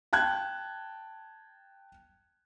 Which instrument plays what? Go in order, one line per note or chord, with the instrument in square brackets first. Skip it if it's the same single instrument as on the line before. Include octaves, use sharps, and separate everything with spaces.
[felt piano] G5 A5 F#6 G#6